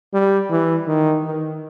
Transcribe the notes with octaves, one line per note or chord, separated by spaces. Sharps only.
G3
E3
D#3
D#3